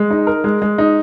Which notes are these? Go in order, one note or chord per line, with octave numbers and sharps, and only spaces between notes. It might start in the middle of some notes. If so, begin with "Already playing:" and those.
Already playing: G#3
D#4
A#4
G#3
G#3
D#4